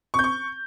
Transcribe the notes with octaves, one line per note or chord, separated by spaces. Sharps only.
C#6
G6
C#6